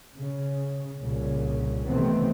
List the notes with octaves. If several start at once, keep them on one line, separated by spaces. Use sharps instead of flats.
C#3
C2 A#2 C#3
C3 D#3 E3 A3 B3 C4